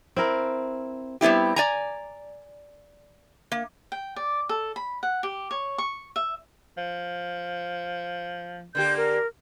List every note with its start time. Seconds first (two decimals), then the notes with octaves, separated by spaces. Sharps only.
0.16 C4 E4 A#4
1.21 G3 B3 C4 E4 G4
1.56 D5 G#5 A#5
3.52 A#3
3.92 G5
4.16 D5
4.49 A4
4.76 B5
5.03 F#5
5.23 G4
5.51 C#5
5.78 C#6
6.16 E5
6.78 F3
8.75 D3 A#3 G4 G6
8.97 A#4